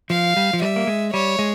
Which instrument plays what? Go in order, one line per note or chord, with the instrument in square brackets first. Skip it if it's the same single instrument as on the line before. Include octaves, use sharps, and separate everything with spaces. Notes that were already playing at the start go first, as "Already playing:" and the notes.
[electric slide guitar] F3 [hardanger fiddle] F5
[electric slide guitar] G3
F3
[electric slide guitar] G3 [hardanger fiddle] E5
[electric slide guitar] A#3
G#3
[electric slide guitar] G3 [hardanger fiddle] C#5
[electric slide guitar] G#3